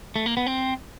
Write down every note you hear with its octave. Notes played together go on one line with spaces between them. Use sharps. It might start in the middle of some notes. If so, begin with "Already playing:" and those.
A3
A#3
B3
C4